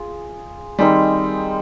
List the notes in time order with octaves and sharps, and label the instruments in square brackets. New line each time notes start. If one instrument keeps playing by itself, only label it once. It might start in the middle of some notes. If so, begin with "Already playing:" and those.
Already playing: [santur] F4 G#4
[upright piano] D#3 G3 [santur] G#3 C4 D#4